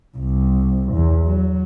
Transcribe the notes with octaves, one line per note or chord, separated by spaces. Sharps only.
C2
E2
F#3